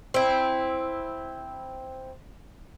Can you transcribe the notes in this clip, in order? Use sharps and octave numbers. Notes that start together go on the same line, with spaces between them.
C4 E4